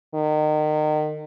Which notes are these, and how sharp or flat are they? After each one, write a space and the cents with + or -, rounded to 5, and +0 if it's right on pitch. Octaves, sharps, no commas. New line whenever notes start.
D#3 -30